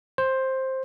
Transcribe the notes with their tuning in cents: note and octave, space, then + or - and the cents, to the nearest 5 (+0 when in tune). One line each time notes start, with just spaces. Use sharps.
C5 +10